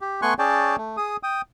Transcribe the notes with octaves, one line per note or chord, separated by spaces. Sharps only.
G4
A3 B3 G#5 C6 C#6 F#6
C#4 G#4 C#5 D5 G5 A5
A3
G#4 D#6
G5 D#6